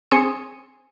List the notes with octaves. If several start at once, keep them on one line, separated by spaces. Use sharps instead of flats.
C4 G#4 G#5 C6 D#6 C#7